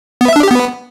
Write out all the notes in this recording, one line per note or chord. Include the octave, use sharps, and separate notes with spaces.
B3
E5
D4
G4
B3